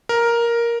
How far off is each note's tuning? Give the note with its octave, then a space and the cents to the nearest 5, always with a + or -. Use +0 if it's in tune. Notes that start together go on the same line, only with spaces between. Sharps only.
A#4 +5